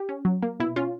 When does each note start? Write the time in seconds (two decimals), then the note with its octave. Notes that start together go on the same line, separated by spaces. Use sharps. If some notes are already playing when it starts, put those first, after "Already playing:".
Already playing: G4
0.09 C#4
0.25 F#3
0.42 A#3
0.60 B2 E4
0.76 C#4 F4